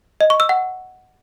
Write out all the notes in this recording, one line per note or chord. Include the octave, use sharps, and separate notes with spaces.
D#5
C#6
E6
F#5